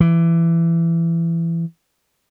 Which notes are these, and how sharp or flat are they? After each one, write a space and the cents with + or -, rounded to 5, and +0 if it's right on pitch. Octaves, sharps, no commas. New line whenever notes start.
E3 +20